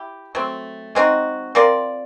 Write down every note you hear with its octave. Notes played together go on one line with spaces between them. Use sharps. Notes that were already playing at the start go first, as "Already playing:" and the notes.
Already playing: E4 G4
F#3 A3 C4
G#3 C4 D#4 F#4
C4 F4 A#4 D5